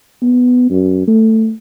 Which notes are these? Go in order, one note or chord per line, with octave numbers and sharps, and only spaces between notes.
B3
F#2
A3